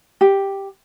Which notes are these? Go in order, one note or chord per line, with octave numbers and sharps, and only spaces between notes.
G4